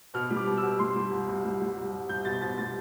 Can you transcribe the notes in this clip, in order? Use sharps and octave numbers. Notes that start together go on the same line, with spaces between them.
B2 F6
G3
D6
B2
E6
B2
G3 C6
G3
C2
C2
G3
G3
C2
C2
C2 G6
B2 A6
B2 A6
G3 A6